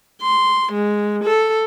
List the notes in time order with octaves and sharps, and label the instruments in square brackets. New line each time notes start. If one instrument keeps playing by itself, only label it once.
[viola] C6
G#3
A4